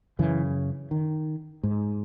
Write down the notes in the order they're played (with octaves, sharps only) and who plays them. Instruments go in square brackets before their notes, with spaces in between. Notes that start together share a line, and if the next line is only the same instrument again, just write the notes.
[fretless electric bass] F#2 C#3 E3
D#3
G#2